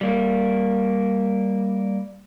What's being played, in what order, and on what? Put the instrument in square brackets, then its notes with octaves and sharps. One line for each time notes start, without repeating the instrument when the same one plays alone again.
[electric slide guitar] G3 A#3